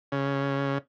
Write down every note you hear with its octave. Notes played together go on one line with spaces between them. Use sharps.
C#3